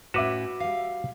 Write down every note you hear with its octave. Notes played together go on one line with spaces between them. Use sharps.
A2 C#4 F#4 B4 E5 D6 E7
G3 F5